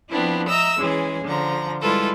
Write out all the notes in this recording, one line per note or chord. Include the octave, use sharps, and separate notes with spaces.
F3 B3 C4 D4 E4
D#5 E5 A#5 E6
E3 G#3 C#4 G#4
D3 F3 A#5
G3 G#3 E4 F4 A4 B4